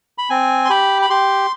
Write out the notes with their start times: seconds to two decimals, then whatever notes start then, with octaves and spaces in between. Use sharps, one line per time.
0.18 B5
0.30 C4 G#5
0.65 C6
0.70 G4 B5
1.02 B5
1.10 G4 C6